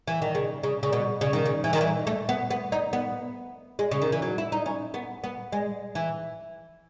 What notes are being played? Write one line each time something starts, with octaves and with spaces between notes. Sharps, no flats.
E3
D#3
C#3
C#3
C#3
B2
C#3
D#3
C#3
E3
D#3
E3
A3
B3
B3
D#4
B3
G#3
C#3
D#3
E3
F#3
E4
D#4
C#4
B3
B3
G#3
E3